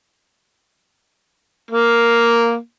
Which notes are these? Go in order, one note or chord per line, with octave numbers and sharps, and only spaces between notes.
A#3